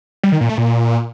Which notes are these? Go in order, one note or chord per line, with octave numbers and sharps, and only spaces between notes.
G3
D#3
A#2
A3
A#2